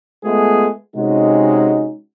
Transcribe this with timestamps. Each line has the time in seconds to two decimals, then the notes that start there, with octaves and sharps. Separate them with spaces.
0.24 G#3 A3 B3 F4 G#4
0.96 C3 G#3 C#4 D#4 F#4